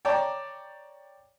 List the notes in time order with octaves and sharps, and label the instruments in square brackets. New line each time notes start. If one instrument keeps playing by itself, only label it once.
[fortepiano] C#5 D5 G5 A5 A#5 D6